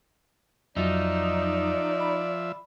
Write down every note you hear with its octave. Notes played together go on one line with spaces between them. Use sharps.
F2 F3 F#3 D#4 D5 E5
B5